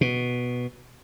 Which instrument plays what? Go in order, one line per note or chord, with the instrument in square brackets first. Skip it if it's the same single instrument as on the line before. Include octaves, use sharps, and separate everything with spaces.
[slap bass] B2